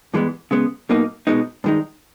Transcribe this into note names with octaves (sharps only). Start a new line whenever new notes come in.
G2 E3 G#3 B3
C#3 G#3 B3
B1 B2 A#3 D#4
B2 G#3 B3 D#4
G2 D#3 G#3 D#4